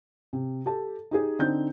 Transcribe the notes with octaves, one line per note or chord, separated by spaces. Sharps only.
C3
G4 A4 A5
D#4 G4 G#4
D3 C4 D#4 G6